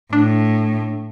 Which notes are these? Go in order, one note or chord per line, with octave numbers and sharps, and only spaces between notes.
A2 D4